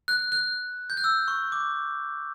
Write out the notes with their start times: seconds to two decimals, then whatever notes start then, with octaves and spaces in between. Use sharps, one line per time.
0.08 F#6
0.32 F#6
0.90 G6
0.97 F#6
1.04 E6
1.28 C#6
1.52 D6